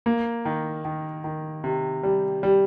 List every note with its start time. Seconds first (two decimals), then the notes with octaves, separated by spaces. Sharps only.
0.06 A#3
0.45 D#3
0.85 D#3
1.24 D#3
1.64 C3
2.03 G3
2.43 G3